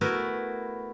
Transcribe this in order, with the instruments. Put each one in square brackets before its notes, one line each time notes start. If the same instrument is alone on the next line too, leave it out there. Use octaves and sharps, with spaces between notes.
[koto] A3 B3 E4 F#4 A#4 B4